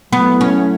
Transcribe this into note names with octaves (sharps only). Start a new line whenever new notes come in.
F#3 A3 B3 E4
C#4